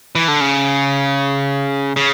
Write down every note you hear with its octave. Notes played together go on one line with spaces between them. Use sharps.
E3
D3
C#3
C#3